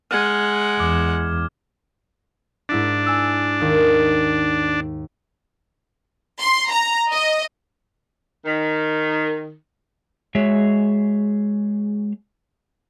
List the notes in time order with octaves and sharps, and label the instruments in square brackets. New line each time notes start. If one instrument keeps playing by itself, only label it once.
[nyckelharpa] G#3 F#5 [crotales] F6 G#6
[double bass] E2 [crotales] D6
[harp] G#2 E4 B6 [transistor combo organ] D4
[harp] G#5 E6
D#2 D#4
[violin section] C6
A#5
D#5
[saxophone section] D#3
[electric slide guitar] G#3 F#4 G#4 C#5 E5